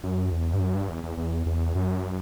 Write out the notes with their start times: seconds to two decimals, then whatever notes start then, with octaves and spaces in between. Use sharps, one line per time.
0.04 F#2
0.32 E2
0.53 G2
0.60 F#2
0.75 G2
0.89 E2
1.04 E2
1.18 E2
1.46 E2
1.75 F#2